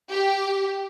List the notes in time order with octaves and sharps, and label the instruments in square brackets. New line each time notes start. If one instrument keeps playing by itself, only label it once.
[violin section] G4